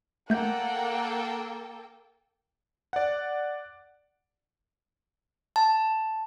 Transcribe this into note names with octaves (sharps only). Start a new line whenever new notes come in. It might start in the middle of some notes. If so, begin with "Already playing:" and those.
A3 A#3 A4 F#5 G5 G6
D5 F#5
A5